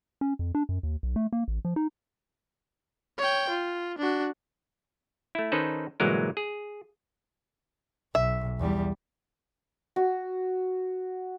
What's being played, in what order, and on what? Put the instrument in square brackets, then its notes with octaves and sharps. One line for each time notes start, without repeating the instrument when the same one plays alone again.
[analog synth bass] C#4
F2
D4
F#2
D#2
B1
A3
A#3
A1
F3
D#4
[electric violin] C#5 G5
F4
D4 F#4
[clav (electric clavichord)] A3 E4
D#3 C#4 D#4 A4 B4 C5
G1 A#2 E3 F#3 G#3 A#4
G#4
[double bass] B1 [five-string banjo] E5
[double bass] E2 G3
[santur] F#4